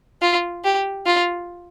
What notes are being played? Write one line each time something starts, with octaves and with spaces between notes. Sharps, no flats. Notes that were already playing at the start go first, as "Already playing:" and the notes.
F4
G4
F4